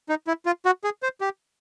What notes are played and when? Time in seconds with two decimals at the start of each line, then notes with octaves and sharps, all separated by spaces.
0.09 D#4
0.27 E4
0.46 F4
0.65 F#4
0.84 G#4
1.03 C5
1.21 G4